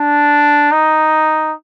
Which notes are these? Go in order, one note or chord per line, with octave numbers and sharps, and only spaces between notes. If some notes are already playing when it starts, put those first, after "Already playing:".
Already playing: D4
D#4